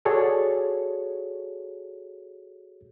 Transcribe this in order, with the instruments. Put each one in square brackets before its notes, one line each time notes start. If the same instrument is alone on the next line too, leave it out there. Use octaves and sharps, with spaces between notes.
[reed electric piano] F#4 G#4 A4 C#5 D5